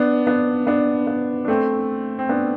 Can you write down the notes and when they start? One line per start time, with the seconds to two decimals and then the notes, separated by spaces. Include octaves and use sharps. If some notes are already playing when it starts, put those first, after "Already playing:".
Already playing: B3 D4
0.27 B3 D4
0.67 B3 D4
1.07 B3
1.45 D4
1.48 A3 C4
2.19 C4
2.29 B3 D4